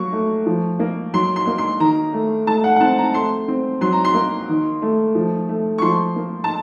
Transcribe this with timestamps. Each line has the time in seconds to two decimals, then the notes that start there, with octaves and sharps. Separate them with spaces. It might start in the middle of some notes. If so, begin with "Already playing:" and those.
Already playing: F#3 A#3 C#6
0.12 A3
0.46 F3
0.79 A#3
1.13 F#3 C6
1.36 C6
1.47 A#3
1.58 C6
1.80 D#3 A#5
2.13 A3
2.47 A3 A5
2.64 F#5
2.76 F#5
2.81 C4 A5
2.98 A#5
3.14 A3 C6
3.48 C4
3.81 F#3 C6
3.93 A#5
4.05 C6
4.14 A#3
4.49 D#3
4.82 A3
5.15 F3
5.49 A3
5.78 C#6
5.82 F3 C6
6.16 A#3
6.44 A5